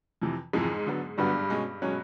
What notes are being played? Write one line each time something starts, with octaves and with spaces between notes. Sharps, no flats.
F2 C3 E3
F2 G#2 C3 E3 G#3
D3 F#3 B3
G2 D3 F#3 G3 B3
B2 G#3 C#4
B2 F#3 G#3 C#4